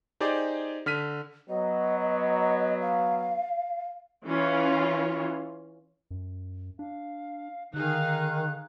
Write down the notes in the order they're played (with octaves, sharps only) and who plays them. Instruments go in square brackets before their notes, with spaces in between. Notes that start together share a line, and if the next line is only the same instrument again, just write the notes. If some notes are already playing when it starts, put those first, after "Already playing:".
[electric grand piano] D#4 G4 G#4 C5 D5
D3 F6 B6 D#7
[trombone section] F#3 B3 [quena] D#5
[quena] F5
[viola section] E3 C#4 F4
[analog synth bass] F#2
[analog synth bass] D4 [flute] F5
[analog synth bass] D3 [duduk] D#3 [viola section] D#4 G#4 F5 [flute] F#6